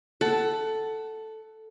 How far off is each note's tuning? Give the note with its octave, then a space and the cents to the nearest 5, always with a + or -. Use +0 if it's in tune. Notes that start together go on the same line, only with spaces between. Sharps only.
A4 +0 F#5 +20